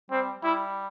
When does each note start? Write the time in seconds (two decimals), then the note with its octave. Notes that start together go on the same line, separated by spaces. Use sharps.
0.11 G3 C4
0.43 G3 E4